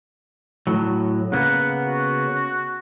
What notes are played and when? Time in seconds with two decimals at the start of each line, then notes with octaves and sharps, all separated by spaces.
0.67 A2 F#3
1.32 C#3 A#3 B3 F#5
1.87 F#4